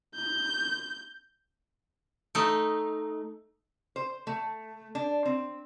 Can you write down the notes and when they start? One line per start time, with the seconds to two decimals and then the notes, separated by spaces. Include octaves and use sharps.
0.15 G6
2.35 A3 D#4
3.96 C5
4.27 A3
4.95 D4
5.26 C4